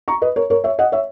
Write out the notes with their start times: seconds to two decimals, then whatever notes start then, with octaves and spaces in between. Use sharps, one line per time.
0.08 A#5 C#6
0.22 B4 D#5
0.36 A#4 C#5
0.50 A#4 C#5
0.64 C#5 E5
0.79 D#5 F#5
0.92 C#5 E5